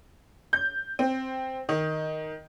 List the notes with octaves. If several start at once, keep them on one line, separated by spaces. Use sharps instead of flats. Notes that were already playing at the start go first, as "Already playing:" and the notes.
G6
C4
D#3